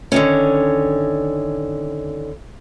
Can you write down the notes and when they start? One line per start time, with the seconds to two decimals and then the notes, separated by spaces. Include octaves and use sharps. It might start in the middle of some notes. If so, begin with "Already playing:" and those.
0.12 D3 D#3 C#4